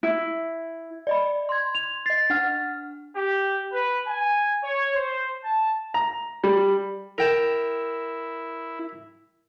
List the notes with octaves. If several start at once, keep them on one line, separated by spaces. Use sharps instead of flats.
E4
D5 D#5 B5
C6 G#6
F7
D#5 A6 C7
D4 F#5 F6
G4
B4
G#5
C#5
C5
A5
A#5
G3
E4 A#4 G5 A5